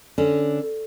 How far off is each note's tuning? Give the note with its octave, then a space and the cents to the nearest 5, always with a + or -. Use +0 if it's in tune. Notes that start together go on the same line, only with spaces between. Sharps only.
D3 +0 C#4 +0